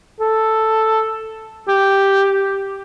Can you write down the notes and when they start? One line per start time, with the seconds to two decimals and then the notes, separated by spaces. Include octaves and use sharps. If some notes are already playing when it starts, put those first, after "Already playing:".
0.20 A4
1.68 G4